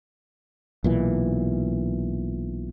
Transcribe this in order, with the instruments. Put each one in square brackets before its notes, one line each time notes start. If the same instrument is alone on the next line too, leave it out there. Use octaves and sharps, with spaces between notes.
[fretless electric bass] B1 A#2 E3